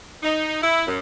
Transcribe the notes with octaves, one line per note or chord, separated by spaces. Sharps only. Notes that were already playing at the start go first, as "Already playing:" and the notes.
D#4
E4
F#2